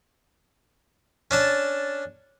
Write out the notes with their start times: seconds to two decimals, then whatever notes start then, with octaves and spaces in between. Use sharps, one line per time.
1.31 C#4 D4 A5